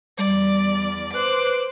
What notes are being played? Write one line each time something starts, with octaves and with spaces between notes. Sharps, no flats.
E2 G3 D5
B4 C5 D6 F#6